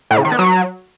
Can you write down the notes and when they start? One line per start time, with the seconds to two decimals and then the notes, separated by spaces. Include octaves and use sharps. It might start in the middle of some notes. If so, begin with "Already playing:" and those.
0.11 A2
0.18 C#3
0.25 D#3
0.32 B3
0.39 F#3